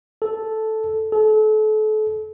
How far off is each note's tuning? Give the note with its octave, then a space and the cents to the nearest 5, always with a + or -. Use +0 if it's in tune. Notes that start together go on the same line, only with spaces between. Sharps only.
A4 -5
A4 -35